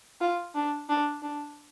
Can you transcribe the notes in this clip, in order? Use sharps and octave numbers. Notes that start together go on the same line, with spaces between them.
F4
D4
D4
D4